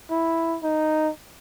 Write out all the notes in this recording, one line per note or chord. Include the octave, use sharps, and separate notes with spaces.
E4
D#4